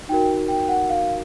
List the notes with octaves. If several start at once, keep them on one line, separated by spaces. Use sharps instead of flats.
D#4 F#4 A#4 G5
G5
F#5
F5